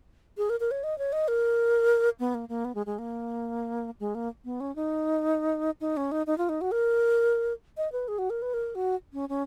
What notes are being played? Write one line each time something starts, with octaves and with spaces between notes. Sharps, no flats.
G#4
A#4
A#4
C#5
D#5
C#5
D#5
A#4
B3
A#3
A#3
B3
G#3
G#3
A#3
G#3
A#3
B3
C#4
D#4
D#4
C#4
D#4
D#4
F4
D#4
F#4
A#4
D#5
B4
G#4
F#4
A#4
B4
A#4
F#4
C#4
C#4